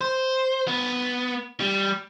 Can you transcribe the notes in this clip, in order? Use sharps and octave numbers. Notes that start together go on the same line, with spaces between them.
C5
B3
G3